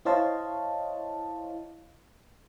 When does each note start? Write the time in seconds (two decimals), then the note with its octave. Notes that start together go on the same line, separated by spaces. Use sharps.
0.05 E4 C5 C#5 D#5 F5 A5